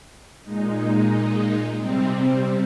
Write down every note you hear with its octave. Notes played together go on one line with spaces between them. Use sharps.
A#2 G#3 D#4
C3 G3 C4